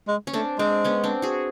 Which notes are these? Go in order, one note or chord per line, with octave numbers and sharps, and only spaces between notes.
G#3
C#4
A3 C4 D4
G#3 C4 D4
B3 C#4
C4 D4
F#4 G#4